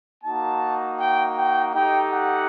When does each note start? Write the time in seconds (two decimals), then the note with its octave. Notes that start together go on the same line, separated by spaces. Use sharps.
0.22 A#3 D#4 F#4 A5
0.97 G5
1.35 G5
1.72 A3 D#4 G4 G5
2.10 F#5